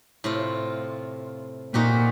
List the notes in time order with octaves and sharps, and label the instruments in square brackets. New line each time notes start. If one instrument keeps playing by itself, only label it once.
[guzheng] A2 C3 F4
[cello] A#2 [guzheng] D#4 F#4 G4